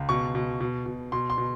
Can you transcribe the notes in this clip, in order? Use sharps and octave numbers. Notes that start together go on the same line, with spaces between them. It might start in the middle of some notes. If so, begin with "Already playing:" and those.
Already playing: C#2
B2 C#6
B2
B2
B2
B2 C6
C6
B2